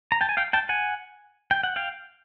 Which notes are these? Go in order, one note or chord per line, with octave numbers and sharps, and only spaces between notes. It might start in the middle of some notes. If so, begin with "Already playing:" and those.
A#5
G5 A5
G#5
F5 G5
G5 A5
F#5 G#5
G5
F#5
F5 G5